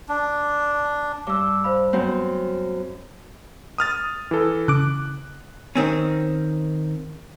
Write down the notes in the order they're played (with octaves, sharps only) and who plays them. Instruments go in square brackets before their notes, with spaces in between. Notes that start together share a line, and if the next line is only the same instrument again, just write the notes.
[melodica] D4
[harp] G2 [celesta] D6 E6
[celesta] C5 F5 B5
[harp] F#2 B3 C4 [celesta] C#5
[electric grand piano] D#6 F6 A6
E3 A4
[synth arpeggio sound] C#3 D6 [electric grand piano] F#6
[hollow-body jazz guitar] D#3 C4 C#4